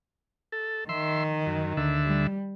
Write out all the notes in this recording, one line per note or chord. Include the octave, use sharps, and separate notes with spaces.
A4
D#3 E5 C6
F#2
D2 D3 E5
G3